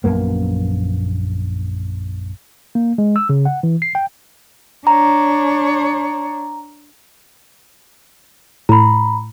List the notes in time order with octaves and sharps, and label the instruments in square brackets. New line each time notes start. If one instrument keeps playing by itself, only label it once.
[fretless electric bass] A#1 F#2 A#3 B3
[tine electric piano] A#3
G#3
E6
C#3
F#5
E3
C7
G5
[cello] D4 C#5 [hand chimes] A#5
[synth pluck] A2 [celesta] A#5 B5